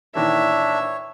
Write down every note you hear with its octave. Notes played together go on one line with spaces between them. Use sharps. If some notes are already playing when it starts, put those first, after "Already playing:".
A#2 D#3 E3 D4 C#5 E5